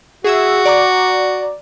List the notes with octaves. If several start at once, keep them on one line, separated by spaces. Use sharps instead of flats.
F#4 G#4 E5 E6
D5 A#5 D6